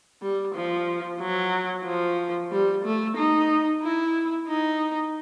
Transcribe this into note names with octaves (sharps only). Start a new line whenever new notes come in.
G3
F3
F#3
F3
G3
A3
D#4
E4
D#4